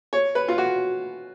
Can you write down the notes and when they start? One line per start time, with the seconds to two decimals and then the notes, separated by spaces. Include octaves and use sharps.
0.13 C#5
0.35 B4
0.48 F4
0.58 F#4